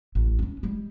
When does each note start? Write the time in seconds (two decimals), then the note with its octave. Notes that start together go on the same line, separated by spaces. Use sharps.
0.15 A1
0.39 C#4 D4
0.63 G3 G#3